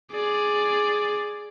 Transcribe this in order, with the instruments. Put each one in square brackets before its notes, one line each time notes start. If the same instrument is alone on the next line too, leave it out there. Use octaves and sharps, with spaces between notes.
[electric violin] G#4 D5